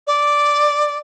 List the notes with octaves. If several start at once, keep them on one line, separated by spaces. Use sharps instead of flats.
D5